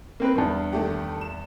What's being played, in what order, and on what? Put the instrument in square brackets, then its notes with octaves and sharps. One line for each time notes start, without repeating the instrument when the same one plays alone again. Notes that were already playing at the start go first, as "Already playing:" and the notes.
[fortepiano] A#3 C4 B4
E2 G2
[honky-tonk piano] D#3 A3 G4
E7